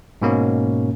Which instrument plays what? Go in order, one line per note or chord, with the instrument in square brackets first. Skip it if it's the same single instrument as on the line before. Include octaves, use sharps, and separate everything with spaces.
[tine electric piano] G#2 B2 A#3 C#4